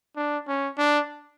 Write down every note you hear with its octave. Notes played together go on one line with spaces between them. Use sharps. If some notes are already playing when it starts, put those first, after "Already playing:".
D4
C#4
D4